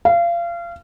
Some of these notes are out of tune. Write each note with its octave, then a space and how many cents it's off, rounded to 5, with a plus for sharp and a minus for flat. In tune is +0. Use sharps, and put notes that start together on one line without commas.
F5 -30